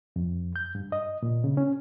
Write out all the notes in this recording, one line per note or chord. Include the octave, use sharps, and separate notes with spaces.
F2
G6
G2
D#5
A#2
C#3
C#4